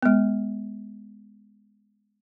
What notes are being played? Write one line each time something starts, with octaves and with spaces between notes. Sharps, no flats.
G#3 B3